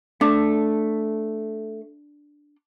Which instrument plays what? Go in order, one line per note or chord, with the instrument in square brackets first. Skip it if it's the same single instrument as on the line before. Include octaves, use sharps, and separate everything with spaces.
[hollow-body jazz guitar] A3 [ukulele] D4